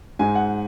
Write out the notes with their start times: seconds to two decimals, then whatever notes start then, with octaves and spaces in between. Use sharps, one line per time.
0.19 G#2 G#3 G#5
0.35 F#5